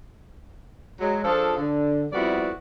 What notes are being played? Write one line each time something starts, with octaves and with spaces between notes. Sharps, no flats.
F#3 G#3
F3 D4 F4 G#4 A4
D3
F2 G3 B3 E4 F#4 D5